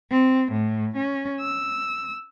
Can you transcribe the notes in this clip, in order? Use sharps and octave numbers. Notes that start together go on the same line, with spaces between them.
C4
A2
C#4
E6